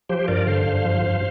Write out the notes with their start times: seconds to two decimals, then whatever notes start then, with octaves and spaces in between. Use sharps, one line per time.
0.09 F3 G4 C5
0.28 G2 A#4 D5
0.47 D3 C5 F5
0.66 G2
0.84 F3
1.03 G2